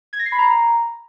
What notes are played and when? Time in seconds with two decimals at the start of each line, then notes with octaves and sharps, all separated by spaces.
0.13 G#6
0.19 A#6
0.26 C7
0.32 B5
0.38 A#5